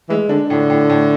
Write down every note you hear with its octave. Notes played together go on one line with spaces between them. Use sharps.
E3 G#3
D3 D4
A2 D3
A2
A2